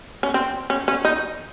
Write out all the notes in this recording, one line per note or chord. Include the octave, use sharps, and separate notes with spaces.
C#4
C4
C#4
C#4
D#4